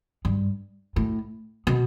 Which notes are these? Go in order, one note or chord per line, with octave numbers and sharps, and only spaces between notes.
G2
A2
B2